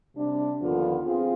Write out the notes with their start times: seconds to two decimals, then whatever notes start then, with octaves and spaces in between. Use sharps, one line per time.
0.15 C3 G3 D4
0.60 D#2 D3 F3 B3 F4
1.04 C4 F4 G#4